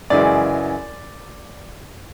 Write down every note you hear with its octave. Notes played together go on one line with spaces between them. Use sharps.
F#2 C#3 E3 G#3 D5